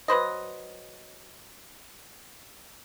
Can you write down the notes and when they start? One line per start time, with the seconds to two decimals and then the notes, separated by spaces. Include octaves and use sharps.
0.08 F#3 B4 C5 D#5